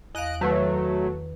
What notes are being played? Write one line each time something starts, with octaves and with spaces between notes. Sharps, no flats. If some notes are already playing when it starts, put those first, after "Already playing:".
E2 D#5 F5 F#6 D7
D#3 F#3 A3 B4 E6